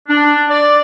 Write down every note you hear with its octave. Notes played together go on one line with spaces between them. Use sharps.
D4
D5